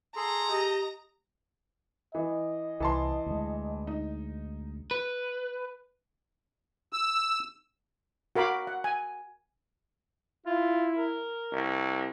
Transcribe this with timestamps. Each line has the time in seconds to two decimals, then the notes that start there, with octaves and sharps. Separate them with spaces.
0.16 G#4 A4 A#5 C6
0.49 G4 D#5
2.15 E3 D#5
2.80 C2 E3 A5 C6
3.26 D2 G#3
3.87 D#4
4.91 B4
6.93 E6
8.36 F#4 A#4 F5 B5 D6
8.67 F#5
8.84 G#5
10.46 E4 F4
10.95 A#4
11.52 C2